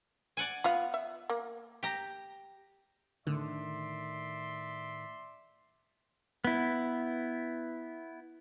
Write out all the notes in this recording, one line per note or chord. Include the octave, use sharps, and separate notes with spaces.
D5 F#5 G#5
B3 F4 F5
E5
A#3
G4 A#5
A2 D3 D#3 D5 E5 C6
B3 E4